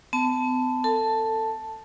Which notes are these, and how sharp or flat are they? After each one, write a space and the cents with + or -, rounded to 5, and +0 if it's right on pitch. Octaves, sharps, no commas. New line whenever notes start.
B3 +45 A5 +0
A4 +25 A5 +0